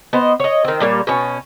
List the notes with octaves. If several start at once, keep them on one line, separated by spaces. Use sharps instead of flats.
B3 C5 D#5
C#5 D#5
D#3 C4
A#2 G3 A#3 C#5
B2 C#4